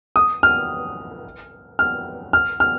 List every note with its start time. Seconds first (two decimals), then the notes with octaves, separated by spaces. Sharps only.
0.16 D#6
0.43 F6
1.79 F6
2.33 F6
2.60 F6